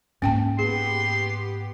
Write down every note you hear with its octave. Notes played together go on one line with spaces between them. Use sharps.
G#2 A#3 C#4 G5 A5
B3 G4 G#4 C6